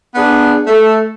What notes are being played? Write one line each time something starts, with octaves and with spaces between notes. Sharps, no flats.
B3 D4 G#4
A3 A4